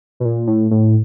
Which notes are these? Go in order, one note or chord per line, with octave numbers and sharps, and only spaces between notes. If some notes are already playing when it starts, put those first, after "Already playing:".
B2
A#2
A2
A2